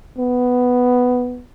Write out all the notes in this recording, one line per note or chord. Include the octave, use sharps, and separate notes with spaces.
B3